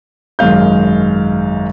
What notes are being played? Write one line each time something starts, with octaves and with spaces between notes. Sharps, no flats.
G#1 F#2 G#3 F5 G6